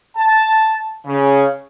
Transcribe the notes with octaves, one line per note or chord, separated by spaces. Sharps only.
A5
C#3